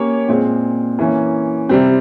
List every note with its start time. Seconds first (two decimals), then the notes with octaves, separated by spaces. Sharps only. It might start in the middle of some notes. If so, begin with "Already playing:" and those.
Already playing: A#3 C#4 G4 C#5
0.28 A#2 G#3 C4
0.99 E3 A#3 C#4
1.69 C3 G3 C4